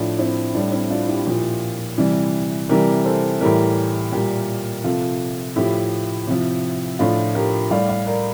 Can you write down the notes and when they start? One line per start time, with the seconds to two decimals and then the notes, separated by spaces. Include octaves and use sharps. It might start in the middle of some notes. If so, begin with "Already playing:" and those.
Already playing: A2 F3 D4
0.18 C4 E4
0.54 A2 G3 D4
0.72 C4 E4
0.90 D4 F4
1.08 E4 G4
1.27 A#2 F3
1.98 C3 E3 G3
2.69 C3 E3 G3 G4 A#4
3.05 A4 C5
3.41 A2 E3 G3 G4 A#4
4.12 A#2 G3 G4 A#4
4.84 C3 F3 F4 A4
5.56 A2 F3 E4 G4
6.27 C3 F3
6.99 A2 F3 D4 F4
7.35 G4 A#4
7.71 A2 G3 D5 F5
7.89 D5 F5
8.06 A#4 D5